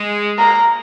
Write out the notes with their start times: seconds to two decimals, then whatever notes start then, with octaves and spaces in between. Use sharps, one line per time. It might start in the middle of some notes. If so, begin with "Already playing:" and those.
Already playing: G#3
0.38 A#3 A#5